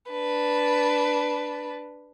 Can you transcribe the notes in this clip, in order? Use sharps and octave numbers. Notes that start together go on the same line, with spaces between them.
D4 B4